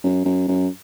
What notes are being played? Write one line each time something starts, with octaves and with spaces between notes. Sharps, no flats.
F#2
F#2
F#2